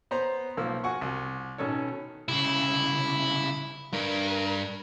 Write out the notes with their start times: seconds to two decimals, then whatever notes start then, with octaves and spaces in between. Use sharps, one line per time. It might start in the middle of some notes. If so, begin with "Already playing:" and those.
0.11 B3 B4 C5 A#5
0.57 B1 F3 A#3 E6
0.84 F#4 F#5 G#5 C#6
1.01 C2
1.58 B2 D#3 C#4 A4 C#5
2.28 C2 C#3 E4
3.93 G2 A#4